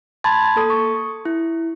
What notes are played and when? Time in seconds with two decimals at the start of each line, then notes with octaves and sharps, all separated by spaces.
0.24 A5 B5 C6 G#6 A6
0.56 A#3 A4 D#6
0.70 C#6
1.25 E4